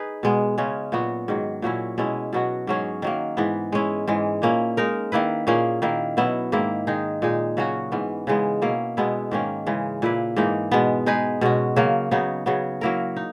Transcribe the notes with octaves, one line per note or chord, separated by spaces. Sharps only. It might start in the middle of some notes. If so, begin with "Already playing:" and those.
Already playing: D#4 G#4 B4
B2 G#3 B3
C#3 G#3 C#4
A#2 F#3 B3 F#4
G#2 D#3 F#3
A#2 F#3 C#4 E4
B2 G#3 C#4 E4
B2 F#3 B3 F#4
G#2 F#3 C#4 G#4
D#3 F#3 A#3
G#2 E3 B3
G#3 C#4 E4
G#2 E3 G#3
A#2 A#3 C#4 E4
G#3 D#4 A#4
D#3 A#3 E4 B4
A#2 A#3 C#4 G#4
D#3 A#3 E4
B2 F#3 B3 E4
G#2 D#3 A#3 E4
D#3 G#3 D#4 G#4
A#2 G#3 D#4 G#4
C#3 F#3 C#4 F#4
G#2 E3 B3
C#3 E3 G#3 B3
B2 A#3 C#4 E4
B2 G#3 B3 E4
G#2 D#3 A#3 C#4
C#3 E3 G#3
A#2 A#3 E4 B4
G#2 E3 A#3 D#4
B2 G#3 B3
G#3 D#4 G#4 B4
B2 G#3 C#4 F#4
C#3 F#3 A#3
C#3 F#3 B3 D#4
C#3 F#3 B3
F#3 A#3 E4 A#4
D#4